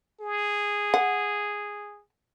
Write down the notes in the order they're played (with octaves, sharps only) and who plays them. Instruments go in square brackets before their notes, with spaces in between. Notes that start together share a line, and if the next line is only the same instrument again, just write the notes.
[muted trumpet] G#4
[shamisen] F#5